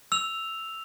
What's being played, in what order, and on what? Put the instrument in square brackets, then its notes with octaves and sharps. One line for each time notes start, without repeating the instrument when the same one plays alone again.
[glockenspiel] E6 F7